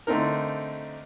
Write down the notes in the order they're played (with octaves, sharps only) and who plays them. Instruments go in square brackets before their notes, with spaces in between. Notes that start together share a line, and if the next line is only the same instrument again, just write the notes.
[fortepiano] D3 A3 C4 D#4 A#4